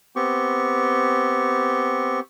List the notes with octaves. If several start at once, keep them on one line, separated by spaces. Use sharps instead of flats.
B3 C4 G4 C#6